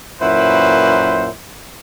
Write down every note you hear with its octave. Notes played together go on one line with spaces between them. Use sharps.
F#2 A#2 E4 B4 C5